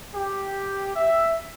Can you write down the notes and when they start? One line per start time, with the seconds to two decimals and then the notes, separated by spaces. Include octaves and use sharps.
0.15 G4
0.96 E5